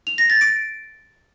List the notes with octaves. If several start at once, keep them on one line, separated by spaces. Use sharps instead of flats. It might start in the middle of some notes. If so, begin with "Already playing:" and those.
F7
A#6
A6
D7